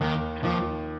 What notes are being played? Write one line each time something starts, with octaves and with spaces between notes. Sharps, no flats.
D#2 D#3
D#2 F3